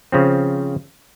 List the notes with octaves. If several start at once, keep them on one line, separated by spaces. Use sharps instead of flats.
C#3 F3 C4